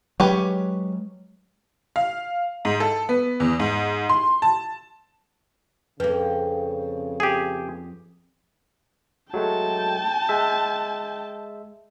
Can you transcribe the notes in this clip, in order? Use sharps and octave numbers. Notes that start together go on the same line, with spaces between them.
F#3 G#3 C#4 G4 B4
F5
G#2
A4
B3
E2
G#2
C6
A5
F2 C#3 A#3 B4
G4 G#4
F#3 G#3 A3 G5 A5
G#3 E5